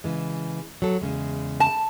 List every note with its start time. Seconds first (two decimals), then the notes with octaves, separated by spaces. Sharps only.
0.04 C#3 E3 G#3
0.82 F#3 A4
1.02 E2 C#3 G#3
1.60 A5